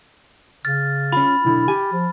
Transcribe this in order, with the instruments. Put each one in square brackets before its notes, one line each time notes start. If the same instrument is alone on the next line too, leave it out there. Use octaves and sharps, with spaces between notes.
[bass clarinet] C#3 [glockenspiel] F6 A6
[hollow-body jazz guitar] C#4 F4 [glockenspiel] B5
[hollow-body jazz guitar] B1 D3 [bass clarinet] E4
[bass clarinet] G4 [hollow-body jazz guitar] G#5
[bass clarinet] F3